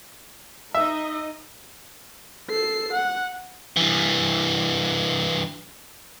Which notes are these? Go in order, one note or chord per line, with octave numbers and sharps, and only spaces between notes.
D#4 D#5 E5
A4 C7
F#5
G2 E3